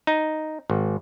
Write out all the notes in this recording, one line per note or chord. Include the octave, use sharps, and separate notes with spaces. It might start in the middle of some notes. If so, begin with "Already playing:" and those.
D#4
G#1